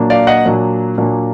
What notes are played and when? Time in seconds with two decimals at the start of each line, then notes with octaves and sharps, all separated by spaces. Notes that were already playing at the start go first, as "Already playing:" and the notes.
Already playing: A#2 F#3 A#3 D4
0.10 D5 F5
0.27 D#5 F#5
0.45 A#2 F#3 A#3 D4
0.98 A#2 F#3 A#3 D4